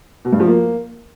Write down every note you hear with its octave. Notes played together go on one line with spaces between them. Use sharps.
B2
G2
F3
A#3